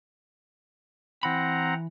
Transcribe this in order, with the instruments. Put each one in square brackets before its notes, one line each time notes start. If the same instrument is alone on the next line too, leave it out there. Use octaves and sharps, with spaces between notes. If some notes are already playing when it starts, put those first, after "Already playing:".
[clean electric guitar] E3 B5 [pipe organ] C4 F#5 A#5